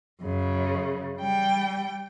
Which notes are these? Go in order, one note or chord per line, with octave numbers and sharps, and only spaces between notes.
F#2 C#3
G3 G5